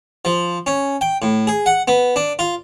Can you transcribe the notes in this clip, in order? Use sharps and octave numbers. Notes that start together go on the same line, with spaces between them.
F3
C#4
G5
A2
G#4
F#5
B3
D4
F4